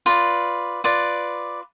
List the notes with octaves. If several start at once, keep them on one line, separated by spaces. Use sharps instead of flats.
F4 B4 D5
F4 B4 D5